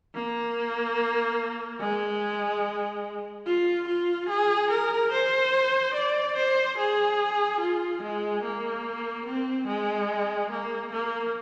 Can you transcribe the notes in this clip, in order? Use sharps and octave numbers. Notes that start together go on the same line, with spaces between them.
A#3
G#3
F4
F4
G#4
A#4
C5
D5
C5
G#4
F4
G#3
A#3
C4
G#3
A#3
A#3